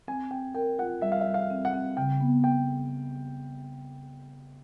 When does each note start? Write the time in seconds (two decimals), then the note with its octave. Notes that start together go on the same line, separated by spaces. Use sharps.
0.08 C4 G#5
0.31 C4 G5
0.55 A#4 G5
0.78 F4 F#5
1.02 G3 E5
1.12 F5
1.21 E5
1.26 G3
1.34 F5
1.50 C4
1.65 F#5
1.74 C4
1.97 C#3 G5
2.21 B3
2.44 B3 G5